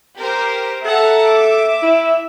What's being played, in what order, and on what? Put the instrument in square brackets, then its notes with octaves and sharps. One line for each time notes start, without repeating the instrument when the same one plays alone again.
[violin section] G4 A#4 C5
[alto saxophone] A4 [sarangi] E5 [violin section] F#5 A5 A#5
[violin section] D6
[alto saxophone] E4